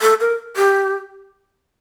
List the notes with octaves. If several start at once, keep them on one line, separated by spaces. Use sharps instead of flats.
A4
A#4
G4